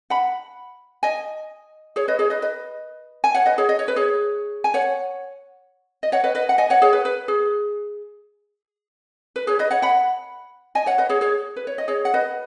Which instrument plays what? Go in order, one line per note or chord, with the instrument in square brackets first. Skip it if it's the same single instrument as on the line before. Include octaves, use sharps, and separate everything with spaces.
[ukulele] F#5 B5
D#5 G#5
G#4 C#5
B4 D#5
G#4 C#5
B4 D#5
B4 D#5
G#5
C#5 F#5
B4 D#5
G#4 C#5
D#5
C#5
B4
G#4 C#5
G#5
C#5 F#5
D#5
C#5 F#5
B4 D#5
B4 D#5
F#5
D#5 G#5
C#5 F#5
G#4 C#5
B4
B4
G#4
B4
G#4 C#5
B4 D#5
C#5 F#5
F#5 B5
D#5 G#5
C#5 F#5
B4 D#5
G#4 C#5
G#4 C#5
B4
C#5
D#5
G#4 C#5
F#5
B4 D#5